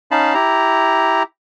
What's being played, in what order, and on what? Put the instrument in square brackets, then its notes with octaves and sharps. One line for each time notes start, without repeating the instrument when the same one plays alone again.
[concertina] C#4 D#4 F5 A5 B5
E4 G4 A#5